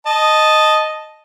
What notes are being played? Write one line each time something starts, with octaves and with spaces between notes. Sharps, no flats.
D#5 A5